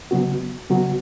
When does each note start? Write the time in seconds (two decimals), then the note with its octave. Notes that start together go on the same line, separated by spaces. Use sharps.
0.11 C#3 F#3 B3 F#4
0.70 C#3 F#3 B3 F#4